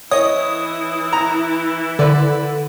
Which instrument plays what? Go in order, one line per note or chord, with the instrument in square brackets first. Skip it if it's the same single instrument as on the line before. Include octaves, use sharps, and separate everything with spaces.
[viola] E3 E4 [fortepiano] C#5 D#5 [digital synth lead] D#6
[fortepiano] A#5
[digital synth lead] D3 [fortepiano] B4 D5